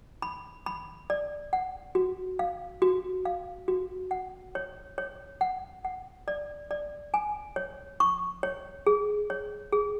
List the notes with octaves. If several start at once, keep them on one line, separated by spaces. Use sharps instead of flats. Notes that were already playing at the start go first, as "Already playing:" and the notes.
B5
B5
D5
F#5
F#4
F5
F#4
F5
F#4
F#5
C#5
C#5
F#5
F#5
D5
D5
G#5
C#5
C#6
C#5
G#4
C#5
G#4